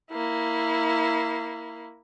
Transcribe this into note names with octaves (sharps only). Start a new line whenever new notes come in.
A#3 E4